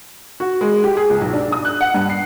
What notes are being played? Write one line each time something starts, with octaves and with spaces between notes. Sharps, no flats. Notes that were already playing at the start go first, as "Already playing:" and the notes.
F#4
G#3
G4
G#4
C#2
B1
D4
D#6
F#6
F#5
G2
C7